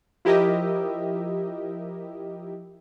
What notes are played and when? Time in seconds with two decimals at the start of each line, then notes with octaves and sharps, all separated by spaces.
0.25 F3 E4 G4 A#4 D#5 E5